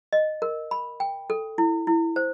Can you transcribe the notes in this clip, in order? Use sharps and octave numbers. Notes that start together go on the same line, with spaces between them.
D#5
A#4
B5
G5
A4
E4
E4
C5